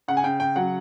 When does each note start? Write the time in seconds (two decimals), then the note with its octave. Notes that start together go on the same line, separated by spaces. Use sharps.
0.08 C#3 F#5
0.17 G#5
0.24 C#3 G5
0.40 C#3 G5
0.56 F#3 F#5